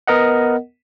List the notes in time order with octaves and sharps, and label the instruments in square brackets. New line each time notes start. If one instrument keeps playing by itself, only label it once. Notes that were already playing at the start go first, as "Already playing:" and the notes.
[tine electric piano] B3 A#4 D#5 F#5